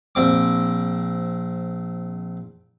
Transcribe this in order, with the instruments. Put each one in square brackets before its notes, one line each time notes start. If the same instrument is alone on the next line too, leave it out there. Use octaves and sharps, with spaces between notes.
[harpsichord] A#1 C4 D6